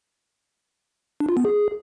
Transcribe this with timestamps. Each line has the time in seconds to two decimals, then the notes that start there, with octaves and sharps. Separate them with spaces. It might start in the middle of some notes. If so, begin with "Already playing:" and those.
1.20 D4
1.29 F4
1.37 B3
1.45 G#4